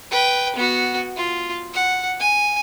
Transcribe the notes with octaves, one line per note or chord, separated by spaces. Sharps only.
B4 G5
B3 F#4
F4
F#5
G#5